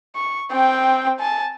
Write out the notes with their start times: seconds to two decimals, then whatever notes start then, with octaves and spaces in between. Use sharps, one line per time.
0.16 C#6
0.51 C4 G5
1.20 G#5 A5